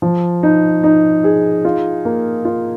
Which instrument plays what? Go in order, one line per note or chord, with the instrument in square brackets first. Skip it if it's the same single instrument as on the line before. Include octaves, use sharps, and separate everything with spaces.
[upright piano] F3
D#4
D#4
G#4
F4
A#3
F4